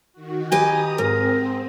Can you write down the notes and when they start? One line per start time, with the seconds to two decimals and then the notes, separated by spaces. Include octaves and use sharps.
0.13 D#3 F#4
0.52 G4 B4 D#5 G#5 A#5 D#6
0.98 G#2 C4 A#4